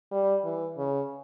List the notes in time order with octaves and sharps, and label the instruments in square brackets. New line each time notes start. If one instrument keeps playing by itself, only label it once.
[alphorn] G3
E3
C#3